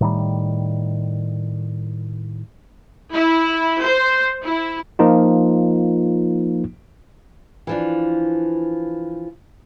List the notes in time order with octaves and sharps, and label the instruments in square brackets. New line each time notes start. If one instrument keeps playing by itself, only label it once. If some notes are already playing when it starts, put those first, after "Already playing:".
[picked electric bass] A2 D#3 G3
[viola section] E4
C5
E4
[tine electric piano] F3 A#3 D#4 F4
[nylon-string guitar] E3 F3 D4